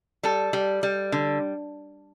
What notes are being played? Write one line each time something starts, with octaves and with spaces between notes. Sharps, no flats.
G3 A4
G3
G3
D3